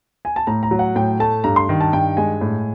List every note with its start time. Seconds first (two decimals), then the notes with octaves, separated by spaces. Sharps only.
0.25 G#5
0.36 A5
0.47 A2 A#5
0.63 A#5
0.71 F#3
0.79 F#5
0.96 A2 G5
1.20 A3 A5
1.44 G2 A#5
1.56 C6
1.69 D#3
1.81 A5
1.93 G2 G5
2.17 G#3 G#5
2.41 A2